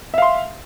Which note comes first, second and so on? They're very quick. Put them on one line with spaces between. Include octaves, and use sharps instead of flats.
E5 F5 C6